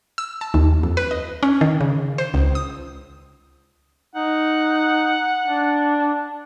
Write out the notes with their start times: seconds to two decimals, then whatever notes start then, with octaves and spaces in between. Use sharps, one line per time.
0.18 E6
0.41 A5
0.54 D#2
0.83 F2
0.97 B4
1.11 D#5
1.43 C#4
1.61 D#3
1.81 C#3
2.18 C5
2.34 C#2
2.55 D#6
4.15 D#4 F#5
5.46 D4